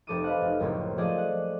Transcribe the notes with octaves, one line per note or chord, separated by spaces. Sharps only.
F1 C4 A4 D6 D#6 D#7
B4 D#5 F5 F#5
F1
F#1 C#2 A2 A#3 C4 C#5
F3 A3 G#4 D5 D#5
F#5